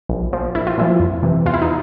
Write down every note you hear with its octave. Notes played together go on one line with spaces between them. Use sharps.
A#1
A#2 F3
A#1 E4
F4
A#2 F3 E4
F2
C3 E3
E2 F4
E4
D#4